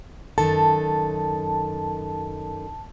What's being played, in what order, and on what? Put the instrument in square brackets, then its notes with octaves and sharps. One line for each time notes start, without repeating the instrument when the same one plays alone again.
[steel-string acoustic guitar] F#2 D#3 A4 [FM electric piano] A5